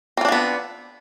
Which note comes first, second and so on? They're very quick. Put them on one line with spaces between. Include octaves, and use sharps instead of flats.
C4 F4 D4 F3 B3